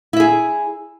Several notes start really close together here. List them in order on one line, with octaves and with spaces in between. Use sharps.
E4 E5 G#4